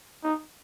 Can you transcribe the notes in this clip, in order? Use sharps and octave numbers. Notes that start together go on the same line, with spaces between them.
D#4